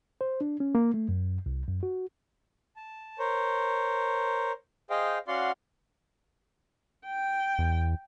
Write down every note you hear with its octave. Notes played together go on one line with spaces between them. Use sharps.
C5
D4
C#4
A#3
A3
F#2
C2
F#2
F#4
A5
A#4 C5 C#5
G#4 C5 D#5 F5 G5
C#4 F#4 D5 F5 F#5 C6
G5
E2